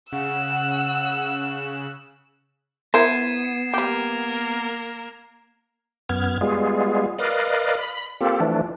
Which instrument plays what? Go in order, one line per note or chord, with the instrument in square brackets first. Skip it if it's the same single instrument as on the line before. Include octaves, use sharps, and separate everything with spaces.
[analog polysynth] C#3 [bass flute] F#5 [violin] E6 F#6
[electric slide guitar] B3 [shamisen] E4 A#4 C5 [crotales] G#6 C7 E7
[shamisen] G3 G4 [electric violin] A#3 A#4
[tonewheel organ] F#2 B3 F6 G#6
G3 G#3 B3 F4 G#4
A#4 B4 D5 D#5 F5
B5
A#3 C4 F4 G4 A4
E3 F3 A3 D4